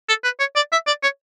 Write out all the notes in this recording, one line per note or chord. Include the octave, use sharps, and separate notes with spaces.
A4
B4
C#5
D5
E5
D5
C#5